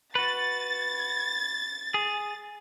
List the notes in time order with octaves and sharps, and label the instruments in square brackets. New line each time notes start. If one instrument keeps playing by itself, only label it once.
[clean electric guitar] F#4 B4 [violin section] A6
[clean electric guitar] G#4